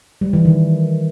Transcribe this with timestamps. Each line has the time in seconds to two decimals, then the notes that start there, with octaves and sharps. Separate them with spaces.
0.21 G3
0.33 E3
0.45 D#3